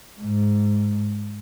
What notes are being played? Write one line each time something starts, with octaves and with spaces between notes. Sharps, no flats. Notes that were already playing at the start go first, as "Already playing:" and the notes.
G#2